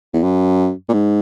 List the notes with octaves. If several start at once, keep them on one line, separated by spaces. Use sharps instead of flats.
E2
F#2
A#2
G#2